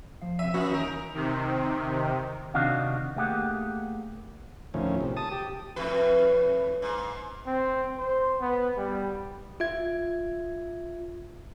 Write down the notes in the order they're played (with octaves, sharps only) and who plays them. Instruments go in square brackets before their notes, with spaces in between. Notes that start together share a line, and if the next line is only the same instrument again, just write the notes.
[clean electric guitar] F3 F5
[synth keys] C3 D#7 [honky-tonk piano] E5
[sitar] A#3 [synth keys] C#4 F#4
[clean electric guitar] D#3 E3 [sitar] D#4 A#4
[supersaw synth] C3 D#3
[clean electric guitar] C3 D#3 D4 D#4 F#4 F5
A3 A#3 G4 G#4 F#5
[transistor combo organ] D2 A2 D#3 F3 C#4
C3
A5 D#6
G4
[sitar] F2 A2 B4
G#2
[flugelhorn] C4
C5
B3
G3
[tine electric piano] F4 E5 G#6